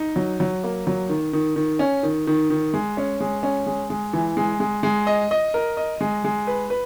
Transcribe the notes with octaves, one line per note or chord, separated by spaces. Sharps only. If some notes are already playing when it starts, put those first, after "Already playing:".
Already playing: D#4
F#3
F#3
A#3
F#3
D#3
D#3
D#3
C#4
D#3
D#3
D#3
G#3
C#4
G#3
C#4
G#3
G#3
E3
G#3
G#3
G#3
D#5
D#5
A#4
D#5
G#3
G#3
B4
B4